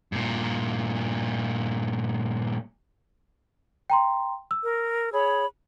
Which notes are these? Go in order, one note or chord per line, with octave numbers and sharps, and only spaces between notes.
G2 A#2
G5 A#5 C6
E6
A#4
G#4 C#5 B5